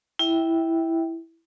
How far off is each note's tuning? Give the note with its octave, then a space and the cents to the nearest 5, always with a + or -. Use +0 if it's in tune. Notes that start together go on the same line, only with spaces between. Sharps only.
E4 +0 E5 -15 G5 +0